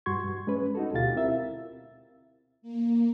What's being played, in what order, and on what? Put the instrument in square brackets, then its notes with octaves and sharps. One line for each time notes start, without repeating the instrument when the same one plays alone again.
[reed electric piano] G2 G3 F#4 C6 C#6 G#6
G2
G#3 C#4 B4
D#4 F#4 A4
D2 B2 F4 G4 F5 A6
C4 E4 A#4 E5
[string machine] A#3